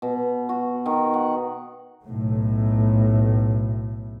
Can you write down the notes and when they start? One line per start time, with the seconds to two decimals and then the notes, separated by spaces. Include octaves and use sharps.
0.02 B2
0.49 F#4
0.86 D#3
1.14 F#5
2.06 B1 A2